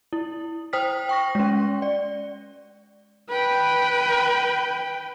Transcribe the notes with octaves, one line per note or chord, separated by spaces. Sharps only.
E4
C5 G5 D#6 F6 B6
G5 C#6 A#6
G#3 C#4
D5
B4 G5